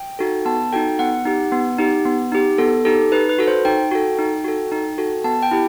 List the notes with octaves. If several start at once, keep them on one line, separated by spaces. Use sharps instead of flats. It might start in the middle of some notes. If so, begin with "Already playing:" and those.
Already playing: G5
D#4 F#4 A4
B3 A5
D#4 F#4 A4 G5
B3 F#5
D#4 G4
B3
D#4 G4
B3
D#4 G4
B3 A4
D#4 G4 A4
D#4 B4
B4
F#4 A4
C5
D#4 G5
F#4 A4
D#4
F#4 A4
D#4
F#4 A4
B3 A5
G5
E4 G4